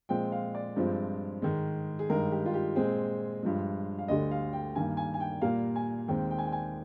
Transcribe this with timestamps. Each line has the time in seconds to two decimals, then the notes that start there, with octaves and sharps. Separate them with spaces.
0.09 A#2 F3 G#3 C4 G5
0.32 F5
0.55 D5
0.76 G2 F3 G#3 C4
1.42 G#2 D#3 G#3
1.99 G#4
2.10 G2 D#3 G#3 A#4
2.31 G4
2.46 F4
2.54 G4
2.76 A#2 G#3 C4 G#4
3.43 G2 F3 G#3
3.98 F5
4.08 D2 D3 G3 D#5
4.31 F5
4.53 G5
4.76 G2 D#3 A#3 G#5
4.97 G#5
5.14 G#5
5.20 G5
5.41 A#2 G3 A#3 F5
5.76 G#5
6.08 D#2 D#3 G#3 C4 G5
6.31 G5
6.38 G#5
6.46 G5
6.52 G#5